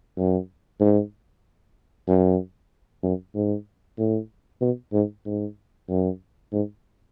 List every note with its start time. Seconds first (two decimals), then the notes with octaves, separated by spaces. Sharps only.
0.18 F#2
0.80 G#2
2.08 F#2
3.03 F#2
3.35 G#2
3.98 A2
4.61 B2
4.93 G#2
5.26 G#2
5.90 F#2
6.52 G#2